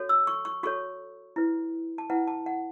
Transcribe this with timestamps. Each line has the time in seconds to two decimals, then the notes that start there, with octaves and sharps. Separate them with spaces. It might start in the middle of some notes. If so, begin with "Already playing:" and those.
Already playing: F#4 A4 C#5
0.09 E6
0.27 C#6
0.45 C#6
0.63 F#4 A4 C#5 C#6
1.36 E4 B4
1.98 A5
2.10 E4 B4 F#5
2.28 A5
2.46 F#5